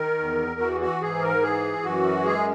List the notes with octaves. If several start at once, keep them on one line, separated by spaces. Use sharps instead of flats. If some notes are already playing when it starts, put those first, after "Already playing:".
Already playing: D#3 A#4
E2
E3 F#4
F#4
G#2 G#4
A#4
E3 G#4
F#2 F#4
G#3 G#4